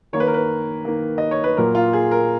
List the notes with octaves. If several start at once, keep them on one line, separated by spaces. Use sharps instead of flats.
D#3 A#3 C#5
B4
A#4
B4
D#3 A#3
D#5
C#5
B4
A#2 F#3 A#3 A#4
F4
G#4
A#4